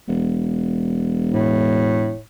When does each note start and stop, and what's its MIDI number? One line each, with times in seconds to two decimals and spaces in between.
0.08 2.13 28
1.33 2.19 45